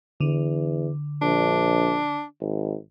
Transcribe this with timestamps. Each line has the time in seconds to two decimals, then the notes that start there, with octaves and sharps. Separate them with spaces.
0.21 E2 D3
1.22 A#1 D4
2.40 G#1